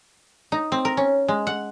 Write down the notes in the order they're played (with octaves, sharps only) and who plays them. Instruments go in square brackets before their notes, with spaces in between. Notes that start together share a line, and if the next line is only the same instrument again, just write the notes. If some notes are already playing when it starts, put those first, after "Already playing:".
[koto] D#4
C4
A#4
C#4
G#3
F#5